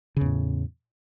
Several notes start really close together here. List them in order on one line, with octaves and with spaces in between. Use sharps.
C#3 E2 A2